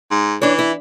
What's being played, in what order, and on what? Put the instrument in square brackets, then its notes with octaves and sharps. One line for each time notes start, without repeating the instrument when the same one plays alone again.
[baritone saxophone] G#2
[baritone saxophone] E3 [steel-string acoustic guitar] D4 C#5
[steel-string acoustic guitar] E4